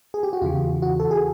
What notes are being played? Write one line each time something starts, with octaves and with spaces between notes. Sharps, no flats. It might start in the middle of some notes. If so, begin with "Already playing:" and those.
G#4
G4
F#4
E2 C#3 E3 F4
F#4
A4
G#4